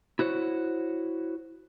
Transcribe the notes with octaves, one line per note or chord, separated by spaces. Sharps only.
E4 F#4 C5 C#5